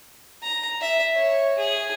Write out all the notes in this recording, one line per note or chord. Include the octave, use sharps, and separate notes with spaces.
A#5
E5
C#5
G#4